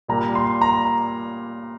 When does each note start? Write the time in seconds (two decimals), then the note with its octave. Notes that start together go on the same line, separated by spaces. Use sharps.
0.08 A#2 G3 A#3 A#5
0.35 C6
0.62 A#5